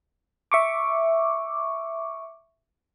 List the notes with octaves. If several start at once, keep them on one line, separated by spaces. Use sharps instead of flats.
E5 C#6 D6